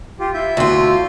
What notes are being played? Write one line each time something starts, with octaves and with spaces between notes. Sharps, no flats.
F4 G4
E4 E5 G6
D2 F4